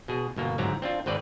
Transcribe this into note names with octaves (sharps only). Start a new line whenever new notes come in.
B2 G#4
G1 B2 A#3
G1 G#2 F#3 C4 G4 A#5
C4 D4 F4
G#1 C4 B4 D5